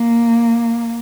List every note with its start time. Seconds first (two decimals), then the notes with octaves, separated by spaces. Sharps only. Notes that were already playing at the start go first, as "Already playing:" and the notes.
Already playing: A#3